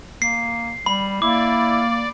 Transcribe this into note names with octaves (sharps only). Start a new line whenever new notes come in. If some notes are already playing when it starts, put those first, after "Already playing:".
A#3 C7
G3 B5
A#3 E4 D5 D6